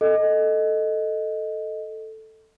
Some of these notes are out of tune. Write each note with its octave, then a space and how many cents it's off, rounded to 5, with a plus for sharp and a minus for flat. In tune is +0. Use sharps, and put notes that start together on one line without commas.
A4 +0 D#5 +0